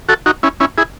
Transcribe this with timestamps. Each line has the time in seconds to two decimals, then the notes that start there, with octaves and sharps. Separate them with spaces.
0.09 F#4 A4
0.26 D#4 F#4
0.43 C#4 E4
0.60 C#4 E4
0.78 E4 G#4